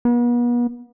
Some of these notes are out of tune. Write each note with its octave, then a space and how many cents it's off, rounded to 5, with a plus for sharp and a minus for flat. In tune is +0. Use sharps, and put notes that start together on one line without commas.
B3 -40